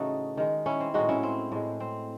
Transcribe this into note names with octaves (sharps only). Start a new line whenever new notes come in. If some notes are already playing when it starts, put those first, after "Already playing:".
Already playing: A2 C#3 E3 A3 D#4 F#4
D#3 G#3
C#4 E4
C4
A2 G#3 D#4 F#4
C#4 E4
C4
A2 G#3
C4